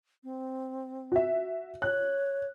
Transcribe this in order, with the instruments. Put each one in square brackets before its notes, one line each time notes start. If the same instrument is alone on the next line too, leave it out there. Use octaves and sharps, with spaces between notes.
[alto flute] C4
[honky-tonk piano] F#4 E5
[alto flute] C#5 [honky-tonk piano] F#6